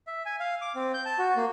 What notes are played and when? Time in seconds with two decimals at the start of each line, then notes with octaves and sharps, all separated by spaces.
0.07 E5
0.26 G#5
0.40 F5
0.61 D6
0.75 C4
0.94 G6
1.05 A5
1.18 F#4
1.36 A#3